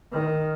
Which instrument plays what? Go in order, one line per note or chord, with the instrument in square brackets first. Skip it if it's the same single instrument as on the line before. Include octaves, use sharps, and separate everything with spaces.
[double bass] D#3